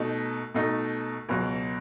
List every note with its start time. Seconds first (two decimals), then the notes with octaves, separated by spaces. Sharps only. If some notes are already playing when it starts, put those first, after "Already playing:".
Already playing: B2 A3 D#4
0.54 B2 A3 D#4
1.29 C#2 B2 F#3